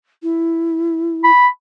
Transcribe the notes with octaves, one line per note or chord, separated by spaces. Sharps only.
E4
B5